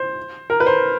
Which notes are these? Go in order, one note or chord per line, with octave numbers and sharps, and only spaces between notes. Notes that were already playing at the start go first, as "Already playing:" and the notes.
Already playing: C5
A#4
B4
C5